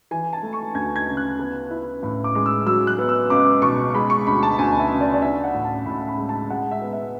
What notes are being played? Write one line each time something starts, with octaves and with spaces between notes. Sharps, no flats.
E3 G#5
A5
A3
C#6
D2 G#6
G#6
C#3
F#6
B3
E4
A2
D6
G#3
E6
F#3 E6
F#6
B3
E6
C#2 D6
B2 C#6
G#3 B5
C#6
D2 B5
A5
D2 G#5
E5
C#3
D5
D5
D4 E5
F#5
A2
A5
A2 B5
B5
G#3
A5
G#3 F#5
E5
B3
E5